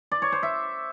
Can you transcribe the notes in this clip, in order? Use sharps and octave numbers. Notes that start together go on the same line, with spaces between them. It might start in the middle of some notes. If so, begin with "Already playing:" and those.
D5
C#5
C5
E5